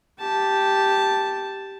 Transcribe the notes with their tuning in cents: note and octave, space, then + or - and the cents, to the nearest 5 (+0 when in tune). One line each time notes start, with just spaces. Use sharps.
G4 +0 A5 +0